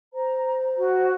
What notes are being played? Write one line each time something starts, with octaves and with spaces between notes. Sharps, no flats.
C5 A#5
F#4